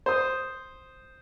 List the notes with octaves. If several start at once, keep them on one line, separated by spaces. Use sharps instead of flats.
C5 D#6